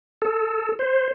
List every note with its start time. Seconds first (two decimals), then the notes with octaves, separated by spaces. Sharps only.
0.22 A4
0.79 C5